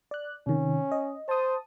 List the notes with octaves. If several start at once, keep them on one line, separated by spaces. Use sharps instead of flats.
D5 F#6
C3 D#3 C#4
D#5
C5 A5 D#6